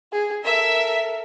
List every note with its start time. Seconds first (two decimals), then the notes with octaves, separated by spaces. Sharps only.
0.12 G#4
0.44 A4 A#4 E5